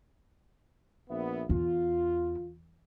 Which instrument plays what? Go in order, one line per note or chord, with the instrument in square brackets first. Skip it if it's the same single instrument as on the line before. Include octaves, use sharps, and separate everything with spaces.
[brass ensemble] A#1 B3 E5
[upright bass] E2 [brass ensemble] F4